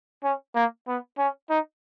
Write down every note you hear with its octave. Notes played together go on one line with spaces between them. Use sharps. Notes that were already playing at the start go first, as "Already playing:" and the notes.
C#4
A#3
B3
C#4
D#4